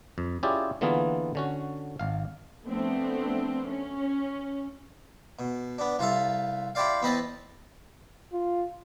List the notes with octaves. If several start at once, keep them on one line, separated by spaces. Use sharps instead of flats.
F2
C#4 E4 F4 G4 G#4 D5
D3 E3 A#3 B3 F4 G#4
D3 C#4 F#4
G#1 F5
F3 A3 B3 C4 D4
C#4
B2
B3 D4
C2 F4 A4 E5
E4 G4 C5 D5 F5
E2 B3 C4 B4 D#5 A5
F4